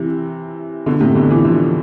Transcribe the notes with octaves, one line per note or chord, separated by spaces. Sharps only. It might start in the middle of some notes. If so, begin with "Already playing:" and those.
Already playing: C3 E3
B2 D3
A2 C3
B2 D3
C3 E3
D3 F3